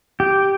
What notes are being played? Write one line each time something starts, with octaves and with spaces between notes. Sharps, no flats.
G4